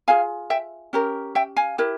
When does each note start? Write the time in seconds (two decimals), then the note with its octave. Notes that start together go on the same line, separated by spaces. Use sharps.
0.08 F4 G#4 F5 G#5
0.50 E5 G5
0.93 C#4 G4 A#4
1.35 E5 G5
1.56 F5 G#5
1.78 E4 G4 A#4